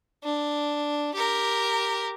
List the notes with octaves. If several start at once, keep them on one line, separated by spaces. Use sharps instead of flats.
D4
G4 A#4